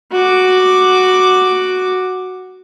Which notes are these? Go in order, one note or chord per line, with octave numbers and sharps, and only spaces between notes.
F#4 D6